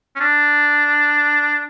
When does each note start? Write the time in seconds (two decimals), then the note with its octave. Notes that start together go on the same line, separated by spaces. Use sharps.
0.16 C#4
0.20 D4